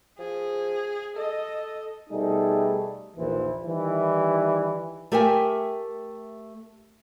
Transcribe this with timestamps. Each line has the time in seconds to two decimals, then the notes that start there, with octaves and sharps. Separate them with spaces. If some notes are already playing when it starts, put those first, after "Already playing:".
0.19 F3 G#4
1.16 A4 D#5
2.10 B2 G3 A3 D#4 G#4
3.17 A#1 D#2 A#2 E3 C5
3.66 D#3 E3 G3 E4
5.12 A3 G4 A#4 E5 G5 G#5